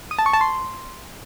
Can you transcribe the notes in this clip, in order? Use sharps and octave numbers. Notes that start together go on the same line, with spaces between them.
D#6
A5
C#6
A5
C6